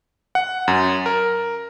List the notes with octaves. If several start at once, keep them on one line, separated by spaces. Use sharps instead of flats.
F#5
F#2
A#4